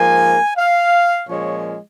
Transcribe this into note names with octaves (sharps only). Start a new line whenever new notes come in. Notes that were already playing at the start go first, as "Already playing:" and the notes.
Already playing: G#2 F3 A#3 G#5
F5
A#2 F3 G#3 C#4 C#5